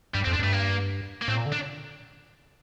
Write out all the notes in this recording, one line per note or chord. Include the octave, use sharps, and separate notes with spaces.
G2 G3
F2 C4
D4
G2 A3
A#3
A#3
A2 C4
A#2
D3
D4